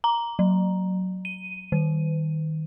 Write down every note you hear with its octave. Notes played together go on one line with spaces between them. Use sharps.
A#5
F#3
D#7
D#3